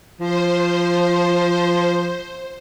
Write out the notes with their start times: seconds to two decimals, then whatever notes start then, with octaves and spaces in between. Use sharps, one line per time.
0.20 F3 C5